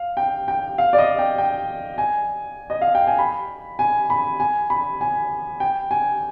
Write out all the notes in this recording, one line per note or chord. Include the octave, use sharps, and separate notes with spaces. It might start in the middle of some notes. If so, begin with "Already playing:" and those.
Already playing: F5
G5
G5
F5
D5
D#5
G5
G5
G#5
D#5
F5
G5
G#5
B5
G#5
B5
G#5
B5
G#5
G5
G#5